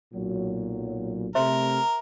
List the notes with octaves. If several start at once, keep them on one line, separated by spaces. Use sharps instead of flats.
B1 A#2 F#3
C3 A3 A#4 C5 E5 C6